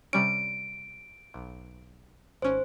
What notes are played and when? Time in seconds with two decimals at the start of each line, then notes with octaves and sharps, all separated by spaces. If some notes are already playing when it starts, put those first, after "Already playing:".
0.13 C3 G3 C#4 D7
1.34 B1
2.42 G#1 C#4 C5